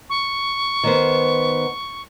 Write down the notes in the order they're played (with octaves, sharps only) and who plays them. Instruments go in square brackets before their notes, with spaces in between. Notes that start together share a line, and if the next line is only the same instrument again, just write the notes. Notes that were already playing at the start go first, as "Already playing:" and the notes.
[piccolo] C#6
[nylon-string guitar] D#3 B3 C5